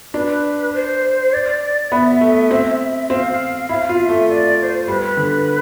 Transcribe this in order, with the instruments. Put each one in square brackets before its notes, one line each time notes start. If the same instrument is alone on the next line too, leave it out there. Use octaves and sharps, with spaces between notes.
[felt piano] D4 [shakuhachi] B4
[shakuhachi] C5
D5
[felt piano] B3 [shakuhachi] E5
[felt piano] A3
C4
[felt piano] C4 [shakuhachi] F5
[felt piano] E4 [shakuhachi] F5
[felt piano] F4
[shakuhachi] E5
[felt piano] A3
[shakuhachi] D5
D5
C5
[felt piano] G3 [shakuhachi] B4 C5
[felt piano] D3